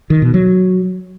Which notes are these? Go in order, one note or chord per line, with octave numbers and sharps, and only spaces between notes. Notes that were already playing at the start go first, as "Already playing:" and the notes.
D#3
B2
F#3